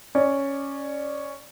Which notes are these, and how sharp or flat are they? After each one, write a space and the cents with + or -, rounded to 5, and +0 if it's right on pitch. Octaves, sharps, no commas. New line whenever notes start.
C#4 +0 D5 +15